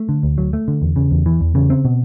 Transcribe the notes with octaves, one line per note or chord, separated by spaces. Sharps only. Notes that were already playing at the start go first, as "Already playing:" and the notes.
Already playing: A3
D3
D2
F#3
A3
D3
E2
C#3
E2
E3
E2
C#3
C4
B2